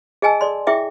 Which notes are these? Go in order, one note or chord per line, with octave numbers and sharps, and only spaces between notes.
G#4 D#5 G#5 A5 E6
A4 D5 C6
E4 G#4 E5 G5 D6